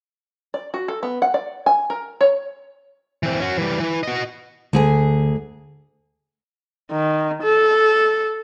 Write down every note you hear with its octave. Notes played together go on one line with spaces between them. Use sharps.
D5
F#4
A4
B3
F#5
D5
G#5
A#4
C#5
E3 C4
C#4 F#4
E3 G3
E3
F#4 D#5
D2 D3 G#4 G#5
D#3
A4